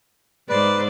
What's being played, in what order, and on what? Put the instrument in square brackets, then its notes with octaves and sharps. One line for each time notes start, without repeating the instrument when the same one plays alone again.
[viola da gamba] G#2 C5 D5 [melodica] B4